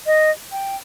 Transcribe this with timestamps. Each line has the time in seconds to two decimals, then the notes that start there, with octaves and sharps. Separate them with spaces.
0.06 D#5
0.52 G5